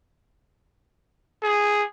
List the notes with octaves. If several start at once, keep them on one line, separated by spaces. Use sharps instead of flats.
G#4